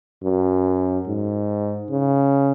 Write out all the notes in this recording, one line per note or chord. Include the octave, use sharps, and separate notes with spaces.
F#2
G#2
C#3